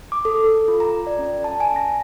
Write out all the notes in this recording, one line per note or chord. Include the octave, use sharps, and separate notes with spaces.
D6
A4
A4
F4
A#5
D5
C#4
A5
G#5
A#6